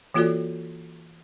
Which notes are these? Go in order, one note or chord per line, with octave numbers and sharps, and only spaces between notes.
E3 A#3 F4 F#4 A4 D5